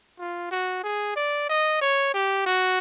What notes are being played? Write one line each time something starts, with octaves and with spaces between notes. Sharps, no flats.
F4
F#4
G#4
D5
D#5
C#5
G4
F#4